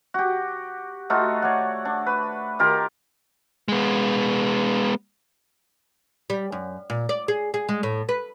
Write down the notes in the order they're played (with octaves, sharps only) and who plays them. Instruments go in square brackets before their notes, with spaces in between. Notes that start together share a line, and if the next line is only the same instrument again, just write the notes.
[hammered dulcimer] F#4 G4
A3 D#4 F4 F#4
C#5 D5 F#5
D4
B4
D#3 F4 G4 A#4
[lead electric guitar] G#3 B3
[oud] G3
F#2
A#2
D5
G#4
G#4
G#3
A2
B4